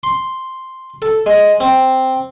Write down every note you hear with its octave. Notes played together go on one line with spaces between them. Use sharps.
C6
A4
G#3
C4